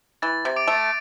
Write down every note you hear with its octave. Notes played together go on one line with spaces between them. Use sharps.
E3 A6
C3
D6 D7
A3